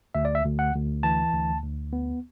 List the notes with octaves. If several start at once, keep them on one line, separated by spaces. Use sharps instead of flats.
D2 E5
D5
E5
D2
F#5
D2
E3 A5
D2
D2
B3